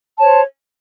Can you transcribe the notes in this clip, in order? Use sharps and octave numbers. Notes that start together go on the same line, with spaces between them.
C5 C#5 A5